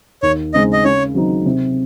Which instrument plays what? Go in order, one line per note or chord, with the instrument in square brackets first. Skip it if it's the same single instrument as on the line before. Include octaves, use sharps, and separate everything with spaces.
[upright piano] D#2 [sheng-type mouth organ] C#5
[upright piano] C#3 G#3 C4 D#4 [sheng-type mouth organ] D#5
[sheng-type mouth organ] D#5
[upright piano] C#3 [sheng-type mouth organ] C#5
[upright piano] F#3 C4 D#4
C3